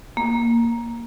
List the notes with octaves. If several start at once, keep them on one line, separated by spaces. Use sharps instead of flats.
A#3